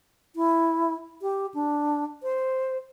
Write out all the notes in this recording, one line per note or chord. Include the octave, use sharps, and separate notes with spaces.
E4
G4
D4
C5